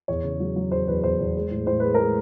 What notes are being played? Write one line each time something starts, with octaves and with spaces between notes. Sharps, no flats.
E2 C#5
C#3
F#3
F#3
E2 C5
E2 B4
E2 C5
E2
G#3
A2
A2 C5
G#3 B4
G#3 A#4